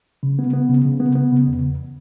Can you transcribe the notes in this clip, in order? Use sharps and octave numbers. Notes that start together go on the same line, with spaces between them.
C#3
B3
B3
C#3
C#3
B3
B3
C#3
E2
E2